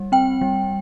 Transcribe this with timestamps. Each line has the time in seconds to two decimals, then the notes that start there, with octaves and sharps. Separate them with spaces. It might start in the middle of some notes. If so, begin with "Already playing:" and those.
Already playing: G3
0.12 C4 G5
0.41 G3